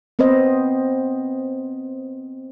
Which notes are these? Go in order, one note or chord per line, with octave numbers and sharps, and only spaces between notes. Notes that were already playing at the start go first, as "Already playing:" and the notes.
B3 C4 B4 C5 D#5